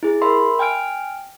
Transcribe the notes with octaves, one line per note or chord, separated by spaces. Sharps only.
E4 G#4
A#4 E5 B5 C6
G5 G#5 F6 D7